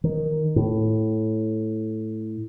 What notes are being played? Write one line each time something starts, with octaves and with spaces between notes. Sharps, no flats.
D#3
A2